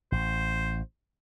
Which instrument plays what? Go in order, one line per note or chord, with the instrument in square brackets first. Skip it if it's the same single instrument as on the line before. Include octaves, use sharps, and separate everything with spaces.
[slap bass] A1 [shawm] C5